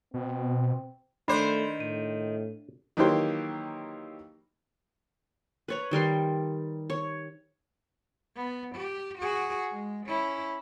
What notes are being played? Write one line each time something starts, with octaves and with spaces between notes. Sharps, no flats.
B2 C4
D#3 A3 D4 C5 B5 C6
A2 D#7
D#3 E3 F#3 A#3 G4 C5
B4 C#5 A#5
D#3 G3 A#4 C6
C#5
B3
G4
F#4 G#4
G#3
C#4 E4